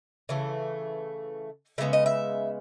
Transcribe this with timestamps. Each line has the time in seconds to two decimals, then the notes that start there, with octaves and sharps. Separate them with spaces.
0.29 C#3 E3 A3
1.78 C#3 G#3 B3 E5
1.93 D#5
2.06 E5